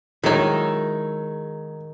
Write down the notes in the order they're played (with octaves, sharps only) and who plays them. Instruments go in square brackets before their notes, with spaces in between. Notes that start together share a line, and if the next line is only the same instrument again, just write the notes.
[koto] D#3 D#4 [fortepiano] F#3 C#5 [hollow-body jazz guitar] G#3 E4 A#4